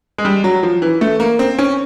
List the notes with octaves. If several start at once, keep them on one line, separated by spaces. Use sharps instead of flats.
G#3
G3
F#3
F3
E3
A3
A#3
C4
C#4